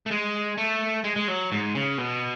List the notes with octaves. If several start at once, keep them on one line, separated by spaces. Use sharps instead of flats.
A3
G#3
A3
G#3
G#3
F#3
G#2
C#3
B2